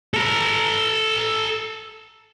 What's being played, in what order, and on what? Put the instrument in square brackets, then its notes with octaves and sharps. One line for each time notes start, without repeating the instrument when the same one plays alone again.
[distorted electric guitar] A4 A#5